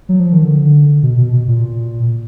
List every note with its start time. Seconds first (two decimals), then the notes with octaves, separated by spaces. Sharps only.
0.09 F#3
0.20 F3
0.33 D#3
0.44 D3
1.03 B2
1.18 B2
1.33 B2
1.48 A#2